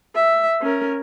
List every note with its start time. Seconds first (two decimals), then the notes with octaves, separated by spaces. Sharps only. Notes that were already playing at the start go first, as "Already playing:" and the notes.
0.15 E5
0.61 C#4 A#4